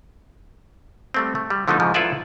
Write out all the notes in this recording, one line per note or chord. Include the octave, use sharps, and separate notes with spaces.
G3 A3 C4
A3
G3
D3 F3 A3 B3 D#4 F#4
G#2 C#3 F3
E4 F4 A4 B4 D5 E5